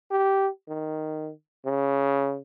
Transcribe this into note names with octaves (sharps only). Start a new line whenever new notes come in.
G4
D#3
C#3